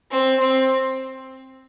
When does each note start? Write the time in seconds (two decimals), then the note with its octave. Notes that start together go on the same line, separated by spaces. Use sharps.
0.11 C4
0.40 C4